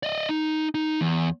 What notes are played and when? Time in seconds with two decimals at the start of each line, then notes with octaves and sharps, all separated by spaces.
0.03 D5 D#5
0.29 D#4
0.75 D#4
1.01 E2